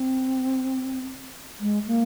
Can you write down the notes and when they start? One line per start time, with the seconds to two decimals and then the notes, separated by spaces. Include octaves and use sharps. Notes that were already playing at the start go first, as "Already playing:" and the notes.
Already playing: C4
1.60 G#3
1.86 A#3